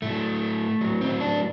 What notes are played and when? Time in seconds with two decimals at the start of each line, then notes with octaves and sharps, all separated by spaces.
0.02 A2 F#3 A3
0.81 A2 F#3
1.01 C4
1.20 D4